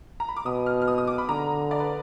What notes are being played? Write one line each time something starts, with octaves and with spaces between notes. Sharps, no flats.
A#5
B5
D6
B2 D#6
F6
F6
D#6
D#6
D6
B5
D3 A#5
D5
B4